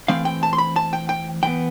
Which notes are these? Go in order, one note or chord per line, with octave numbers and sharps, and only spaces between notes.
E3 A3 C4 F5
G5
A5
C6
B5
A5
G5
G5
E3 B3 G5